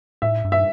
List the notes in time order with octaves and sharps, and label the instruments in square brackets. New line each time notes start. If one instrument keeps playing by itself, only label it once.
[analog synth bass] A2 [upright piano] E5
[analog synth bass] G2
[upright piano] E5